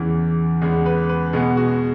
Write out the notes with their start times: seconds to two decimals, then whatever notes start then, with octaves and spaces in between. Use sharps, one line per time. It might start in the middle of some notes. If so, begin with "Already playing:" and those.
Already playing: E2 C#3 E3
0.61 E2 C#3 G#3 B3 G#4
0.86 B4
1.09 B4
1.33 B2 G#3 B3 G#4
1.57 F#4